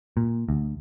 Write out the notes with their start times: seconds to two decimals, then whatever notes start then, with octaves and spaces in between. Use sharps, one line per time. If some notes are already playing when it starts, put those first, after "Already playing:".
0.17 A#2
0.49 D2